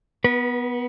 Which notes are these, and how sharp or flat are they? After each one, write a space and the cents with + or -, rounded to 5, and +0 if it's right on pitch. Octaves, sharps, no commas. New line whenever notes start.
B3 +0 B4 -35